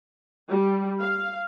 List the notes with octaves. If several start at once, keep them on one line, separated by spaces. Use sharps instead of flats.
G3
F5